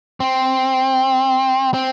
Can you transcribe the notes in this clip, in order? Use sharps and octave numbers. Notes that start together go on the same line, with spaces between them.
C4
C4